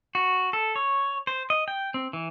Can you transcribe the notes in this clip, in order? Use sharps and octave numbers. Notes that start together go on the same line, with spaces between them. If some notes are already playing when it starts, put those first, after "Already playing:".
F#4
A4
C#5
C5
D#5
G5
C4
E3